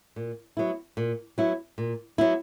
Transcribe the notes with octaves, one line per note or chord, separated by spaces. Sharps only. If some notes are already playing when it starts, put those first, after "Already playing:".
A#2
F#3 B3 E4
A#2
F#3 B3 E4
A#2
F#3 B3 E4